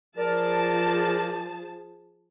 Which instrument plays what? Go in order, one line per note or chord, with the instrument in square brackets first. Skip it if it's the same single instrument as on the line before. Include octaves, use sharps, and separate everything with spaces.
[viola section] F3 G#4 A5 [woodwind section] A#4 D5